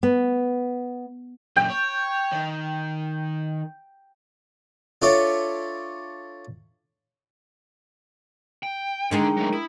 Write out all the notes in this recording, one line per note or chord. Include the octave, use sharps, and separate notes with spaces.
B3
F#2 A#2 G5
C#5
D#3
D4 F4 A4 C#5 D5 E5
G5
D3 D#3 G#3 D4 D#4 G5 A#5
F#3 A3
E4 D#6